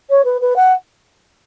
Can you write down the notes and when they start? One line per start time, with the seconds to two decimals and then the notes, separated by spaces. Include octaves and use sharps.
0.10 C#5
0.24 B4
0.41 B4
0.56 F#5